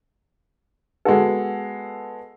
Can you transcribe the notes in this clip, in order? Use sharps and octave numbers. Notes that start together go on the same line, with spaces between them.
G#3 B3 F#4 A4